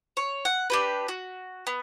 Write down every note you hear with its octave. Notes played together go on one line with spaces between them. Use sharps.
C#5
F#5
D4 G4 B4
F#4
B3